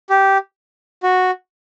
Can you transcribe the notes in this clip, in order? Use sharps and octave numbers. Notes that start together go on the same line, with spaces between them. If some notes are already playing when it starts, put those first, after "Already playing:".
G4
F#4